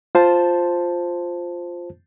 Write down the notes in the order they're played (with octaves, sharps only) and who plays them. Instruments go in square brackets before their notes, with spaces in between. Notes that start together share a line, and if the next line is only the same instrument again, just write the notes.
[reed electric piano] F4 C5 A5